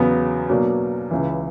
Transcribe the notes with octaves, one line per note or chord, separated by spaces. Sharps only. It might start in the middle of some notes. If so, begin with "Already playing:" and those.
Already playing: E2 C#3 F#3 B3
B2 F#3 A#3 D4
C#2 C#3 E3